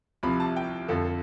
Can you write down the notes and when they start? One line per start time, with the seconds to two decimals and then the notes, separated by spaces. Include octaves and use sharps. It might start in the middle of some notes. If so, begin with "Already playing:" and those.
0.23 C2 C3 F3 B5
0.40 A5
0.56 G5
0.88 F2 D3 F3 A4
1.05 A4